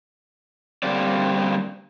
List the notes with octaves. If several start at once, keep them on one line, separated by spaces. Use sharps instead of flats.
D3 G3 A#3 C4 D5